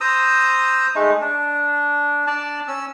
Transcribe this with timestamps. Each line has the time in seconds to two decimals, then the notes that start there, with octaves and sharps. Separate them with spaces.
0.01 C5 A#5 D#6 E6
0.95 G#3 A3 D#4
1.21 D4
2.27 D4 D5 A5
2.68 C#4 E6